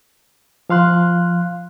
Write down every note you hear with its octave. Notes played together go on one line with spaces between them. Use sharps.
F3 F5 C6 F#6